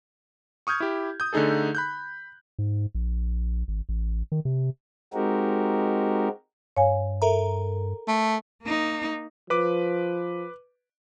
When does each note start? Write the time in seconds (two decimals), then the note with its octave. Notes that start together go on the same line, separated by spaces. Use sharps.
0.67 C#6 D#6 F6 G6 G#6
0.80 E4 G4
1.20 D#6 G6
1.33 D3 A3 D#4 G#4 A4
1.75 B5 F#6 G6
2.59 G#2
2.95 A#1
3.68 G#1
3.89 A1
4.32 D#3
4.45 C3
5.14 G#3 C4 D#4 F#4 G4 A#4
6.77 G2 C#5 F5 G#5
7.22 A4 A#4 E5 A#5
8.07 A3
8.63 A#3 D#4
9.50 F3 B4 D6